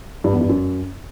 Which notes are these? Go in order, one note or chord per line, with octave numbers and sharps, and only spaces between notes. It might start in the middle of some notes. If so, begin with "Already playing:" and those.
G2
E2
G2
F#2